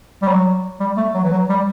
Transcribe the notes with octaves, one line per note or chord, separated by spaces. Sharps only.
G3
F#3
G3
A3
F#3
E3
F#3
G3